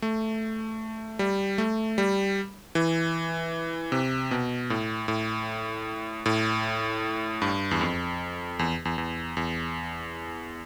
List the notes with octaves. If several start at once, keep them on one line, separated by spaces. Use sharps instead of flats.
A3
G3
A3
G3
E3
C3
B2
A2
A2
A2
G2
E2
F2
E2
E2
E2
E2